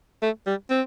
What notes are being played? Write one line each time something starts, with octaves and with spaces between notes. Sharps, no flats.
A3
G3
C4